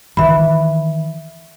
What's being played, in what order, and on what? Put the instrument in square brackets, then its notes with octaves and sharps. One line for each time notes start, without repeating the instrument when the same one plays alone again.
[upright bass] D#3 E3 [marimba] E5 B5